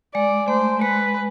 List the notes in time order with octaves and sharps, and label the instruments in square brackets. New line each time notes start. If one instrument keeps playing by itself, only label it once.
[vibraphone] G#3 [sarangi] D5
[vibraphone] A3 [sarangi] C5
[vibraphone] G#3 [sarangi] B4